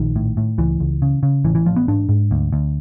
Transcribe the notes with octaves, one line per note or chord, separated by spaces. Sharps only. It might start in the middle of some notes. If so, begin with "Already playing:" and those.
Already playing: A#1 D#3
A2
A2
C#2 E3
C#2
C#3
C#3
A1 E3
E3
A1 F3
B3
G#2 D4
G#2
D2
D2